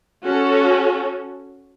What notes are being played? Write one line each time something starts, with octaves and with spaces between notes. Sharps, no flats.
C#4 F#4 A4